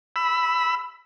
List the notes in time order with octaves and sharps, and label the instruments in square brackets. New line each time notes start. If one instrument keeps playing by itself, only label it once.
[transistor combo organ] B5 E6